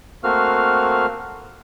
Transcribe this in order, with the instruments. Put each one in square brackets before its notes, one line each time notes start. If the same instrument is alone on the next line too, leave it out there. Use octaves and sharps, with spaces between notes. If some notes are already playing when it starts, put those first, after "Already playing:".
[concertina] A3 A#3 C4 F#4 F5 F6